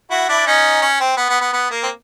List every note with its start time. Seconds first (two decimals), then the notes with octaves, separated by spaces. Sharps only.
0.11 E4 F#4
0.29 D4 E4
0.47 C#4 D#4
0.82 C#4
1.00 C4
1.17 B3
1.29 B3
1.41 B3
1.54 B3
1.71 A#3
1.83 C4